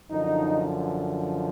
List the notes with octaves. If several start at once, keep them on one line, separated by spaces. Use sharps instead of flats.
F#2 D3 F3 D#4